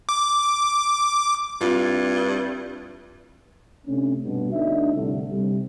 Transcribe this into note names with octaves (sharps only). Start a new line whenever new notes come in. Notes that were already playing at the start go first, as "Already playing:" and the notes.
D6
G2 C4 E4 F4
C3 A3 C#4 D4
G2 B2
D2 D3 D4 D#4 E5
C2 A2 D3
C3 G3